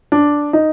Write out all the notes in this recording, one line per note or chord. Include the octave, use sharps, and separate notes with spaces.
D4
D#4